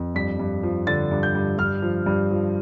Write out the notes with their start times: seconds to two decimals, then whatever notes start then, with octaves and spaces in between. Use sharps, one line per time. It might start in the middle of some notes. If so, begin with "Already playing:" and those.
Already playing: F2
0.15 G2 B6
0.39 G2
0.63 F3
0.87 D3 A6
1.11 G2
1.23 G6
1.35 G2
1.58 G2 F6
1.82 F3
2.06 G2
2.31 F3